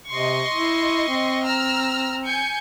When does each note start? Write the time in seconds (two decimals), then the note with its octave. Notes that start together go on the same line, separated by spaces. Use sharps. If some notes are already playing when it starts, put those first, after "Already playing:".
0.11 C3 D#5 C6 C#6
0.54 E4
1.08 C4
1.45 A#5 E6 F6
2.26 G#5 G6 C#7